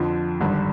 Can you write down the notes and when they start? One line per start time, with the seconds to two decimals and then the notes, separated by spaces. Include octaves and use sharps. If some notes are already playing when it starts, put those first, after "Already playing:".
Already playing: F2 D3 F3
0.41 G#1 G2 D3